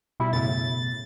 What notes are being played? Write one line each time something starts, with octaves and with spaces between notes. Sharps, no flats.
B2 G3 E4
F#2 A2 C#3 A6